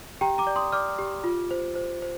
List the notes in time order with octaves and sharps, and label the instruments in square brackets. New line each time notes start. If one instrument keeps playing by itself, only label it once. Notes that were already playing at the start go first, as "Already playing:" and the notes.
[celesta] G4 G5 A#5
A#5 D6
D5
C6 D#6
D5 D6 F6
G4
F4
C5
C5
C5